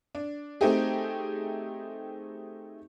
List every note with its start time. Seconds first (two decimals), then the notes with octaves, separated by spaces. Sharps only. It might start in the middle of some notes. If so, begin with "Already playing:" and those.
0.15 D4
0.61 A3 C4 D#4 G4 G#4